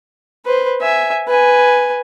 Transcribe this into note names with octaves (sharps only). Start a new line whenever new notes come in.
B4 C5
E5 G#5
B4 G#5